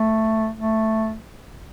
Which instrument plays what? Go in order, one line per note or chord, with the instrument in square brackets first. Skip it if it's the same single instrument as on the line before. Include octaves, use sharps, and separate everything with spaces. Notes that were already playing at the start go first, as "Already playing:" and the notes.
Already playing: [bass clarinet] A3
A3